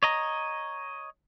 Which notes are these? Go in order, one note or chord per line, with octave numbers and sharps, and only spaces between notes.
C#5 D#5 A#5